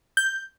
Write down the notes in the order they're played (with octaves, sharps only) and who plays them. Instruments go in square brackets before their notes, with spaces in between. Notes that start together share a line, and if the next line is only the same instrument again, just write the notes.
[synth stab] G6